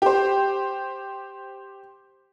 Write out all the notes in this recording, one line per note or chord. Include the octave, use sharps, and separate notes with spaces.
G4 C5